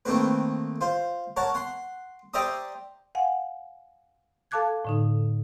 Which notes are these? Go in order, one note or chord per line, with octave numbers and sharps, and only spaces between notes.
D#3 A3 A#3 C4 B4
F4 C5
A#4 C#5 F#5 A5
F#5 C6
G4 C5 D5 E5 A#5 D#6
F5 F#5 G#5
A4 F5 A5 D6 F#6 G#6
A2 D3 D#4